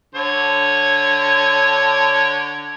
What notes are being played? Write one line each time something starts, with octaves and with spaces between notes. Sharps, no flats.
D3 C#5